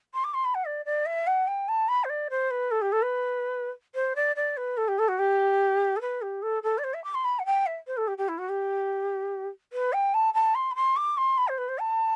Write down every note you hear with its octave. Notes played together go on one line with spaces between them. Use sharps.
C6
D6
C6
B5
F#5
D5
D5
E5
F#5
G5
A5
B5
C5
D5
C5
B4
A4
G4
A4
B4
C5
D5
D5
B4
A4
G4
A4
F#4
G4
A4
B4
G4
A4
A4
D5
C5
E5
D6
C6
B5
F#5
G5
E5
C5
A4
G4
G4
E4
F#4
G4
B4
G5
A5
A5
C6
B5
C6
D6
C6
B5
C5
B4
C5
A5